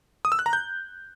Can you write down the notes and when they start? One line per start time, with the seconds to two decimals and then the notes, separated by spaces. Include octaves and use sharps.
0.25 D#6
0.32 E6
0.39 F#6
0.46 A#5
0.53 G6